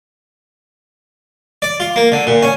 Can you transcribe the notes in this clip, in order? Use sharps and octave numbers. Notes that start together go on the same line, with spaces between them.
D5
F4
A#3
D3
A#2
C#4